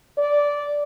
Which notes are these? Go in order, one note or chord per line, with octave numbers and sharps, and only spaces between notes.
D5